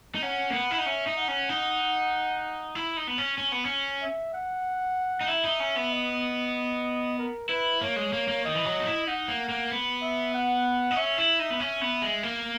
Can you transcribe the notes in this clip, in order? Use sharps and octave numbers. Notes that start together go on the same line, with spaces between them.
D#4
C#4 F#5
A#3
B3
E4
D#4
C#4 E5
D#4
F#5
C#4
D#4
E4
D#4
B3
C#4
C#4
B3
C#4
E5
F#5
D#4
E4 E5
D#4
C#4
B3
D#5
A#4
E4 B4
A#3 C#5
G#3
A#3
A#3
D#3 D#5
E3
F#3
D#4
E4
D#4 F#5
A#3
A#3
B3
E5
F#5
D#4
C#4 E5
E4
D#4
B3
C#4 E5
B3
G#3
A#3